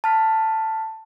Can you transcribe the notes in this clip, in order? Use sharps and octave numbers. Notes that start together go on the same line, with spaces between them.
A5 F6 B6